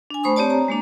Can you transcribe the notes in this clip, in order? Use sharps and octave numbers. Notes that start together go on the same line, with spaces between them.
D4 G#5
A3 C5 B5 C#6 D#6
C4 G4 C#5 D5 A5
A#5
G#3 A#3 D4